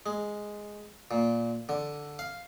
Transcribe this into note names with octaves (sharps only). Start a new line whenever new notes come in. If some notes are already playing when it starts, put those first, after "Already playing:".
G#3
A#2
D3
F5